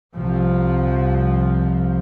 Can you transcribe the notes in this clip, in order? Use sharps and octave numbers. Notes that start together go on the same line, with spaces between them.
C2 F3